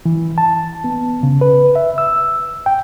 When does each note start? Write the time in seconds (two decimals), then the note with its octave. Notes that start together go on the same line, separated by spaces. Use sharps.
0.06 E3
0.38 A5
0.84 B3
1.23 C#3
1.41 B4
1.76 E5
1.98 E6
2.66 G5